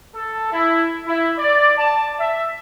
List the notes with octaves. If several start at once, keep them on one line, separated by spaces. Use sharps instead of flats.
A4
E4
E4
D5
A5
E5